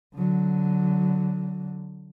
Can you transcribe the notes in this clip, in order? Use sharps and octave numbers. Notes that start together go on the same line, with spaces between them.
D3 F#3